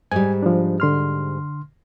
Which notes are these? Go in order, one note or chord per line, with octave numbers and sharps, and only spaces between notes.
G#2 G3 G#5
F3 D4
D3 C6 F6